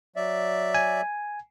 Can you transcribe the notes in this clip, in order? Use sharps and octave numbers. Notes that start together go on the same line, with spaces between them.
F#3 D5 E5
G#5